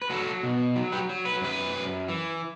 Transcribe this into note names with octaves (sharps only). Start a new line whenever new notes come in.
B4
F#3 F#4 A4
B2
F#3
G4 B4
F#3
B4
F#2 G4 B4
F#2
E3